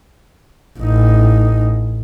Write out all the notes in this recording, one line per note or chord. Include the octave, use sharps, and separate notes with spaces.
A1 D#4